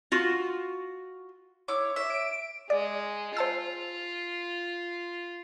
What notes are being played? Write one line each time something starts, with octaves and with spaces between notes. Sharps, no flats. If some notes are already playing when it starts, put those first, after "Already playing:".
F4 F#4
E4 C#5 D6
C#5 E5
D7
G#3 D5
F4 C5 A5 E6